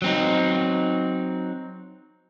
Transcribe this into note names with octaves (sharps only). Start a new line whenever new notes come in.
F#3 C4 D#4